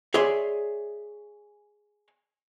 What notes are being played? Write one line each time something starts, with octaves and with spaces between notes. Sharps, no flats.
G#4 C#5 D5 E5 C6